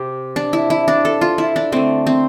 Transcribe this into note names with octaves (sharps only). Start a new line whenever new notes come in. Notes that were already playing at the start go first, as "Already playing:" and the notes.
Already playing: C3 G4
D4
E4
E4
D4
A4
F4
E4
D4
D3 A3 C4
C4